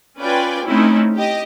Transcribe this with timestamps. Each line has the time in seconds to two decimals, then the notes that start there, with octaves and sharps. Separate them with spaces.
0.19 C#4 F4 B4 D5 G5 G#5
0.66 A3 C4 C#4 D#4 E4
1.14 G4 D#5